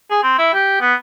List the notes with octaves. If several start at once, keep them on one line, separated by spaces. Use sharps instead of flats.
G#4
C4
E4
G4
B3